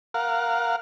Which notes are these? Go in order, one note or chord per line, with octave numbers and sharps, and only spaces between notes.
A#4 F5 F#5